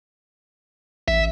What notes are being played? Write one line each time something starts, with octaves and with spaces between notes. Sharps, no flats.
A1 E5